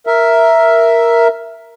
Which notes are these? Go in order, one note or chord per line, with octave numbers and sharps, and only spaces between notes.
A#4 E5